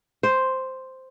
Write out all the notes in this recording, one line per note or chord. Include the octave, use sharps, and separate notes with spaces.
C5